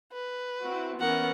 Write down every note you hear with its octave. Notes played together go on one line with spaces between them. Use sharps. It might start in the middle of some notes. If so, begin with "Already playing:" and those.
B4
C4 E4 F#4
E3 B3 C#4 A#4 F#5